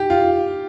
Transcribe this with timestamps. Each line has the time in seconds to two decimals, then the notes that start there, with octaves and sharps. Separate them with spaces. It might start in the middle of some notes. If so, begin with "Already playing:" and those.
Already playing: G4
0.10 F4